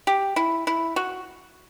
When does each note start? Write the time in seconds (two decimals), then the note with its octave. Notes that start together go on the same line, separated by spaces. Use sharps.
0.07 G4
0.36 E4
0.67 E4
0.96 F#4